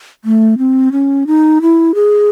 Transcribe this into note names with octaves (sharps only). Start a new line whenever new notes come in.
A3
C4
C#4
D#4
E4
G#4